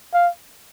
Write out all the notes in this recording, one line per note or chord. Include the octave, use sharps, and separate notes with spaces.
F5